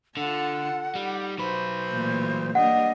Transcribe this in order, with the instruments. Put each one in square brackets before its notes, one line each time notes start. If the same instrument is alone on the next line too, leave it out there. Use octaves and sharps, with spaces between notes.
[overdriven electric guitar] D3 [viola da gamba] F4 A4 [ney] F#5
[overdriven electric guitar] G3 [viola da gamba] D#4
[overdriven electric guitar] F#3 B4 [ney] C5
[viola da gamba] A#2 E3 A3
[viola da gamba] G3 A#3 D4 [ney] D#5 [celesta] F#5